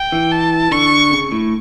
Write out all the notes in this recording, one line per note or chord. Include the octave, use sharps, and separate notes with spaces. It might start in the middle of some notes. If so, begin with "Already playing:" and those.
Already playing: G5
E3
A5
D3 C#6
C#3
A2